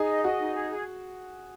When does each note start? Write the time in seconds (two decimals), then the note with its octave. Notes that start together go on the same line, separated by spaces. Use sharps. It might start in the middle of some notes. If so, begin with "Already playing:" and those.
Already playing: D#4 G#4
0.09 D#5
0.24 F#4 D#5
0.39 D#4
0.55 G#4
0.70 G#4